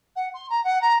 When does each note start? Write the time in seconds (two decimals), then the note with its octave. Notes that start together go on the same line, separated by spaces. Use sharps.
0.15 F#5
0.33 C6
0.49 A#5
0.64 F#5
0.81 A#5